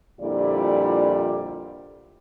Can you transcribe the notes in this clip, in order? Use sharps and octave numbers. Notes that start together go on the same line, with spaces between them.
F2 A#2 D3 G3 E4 D5